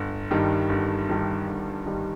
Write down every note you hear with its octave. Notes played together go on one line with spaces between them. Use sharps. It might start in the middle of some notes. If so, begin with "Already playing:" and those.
Already playing: G1
G2 D#3 G3
G1
G2 D#3 G3
G1
G2 D#3 G3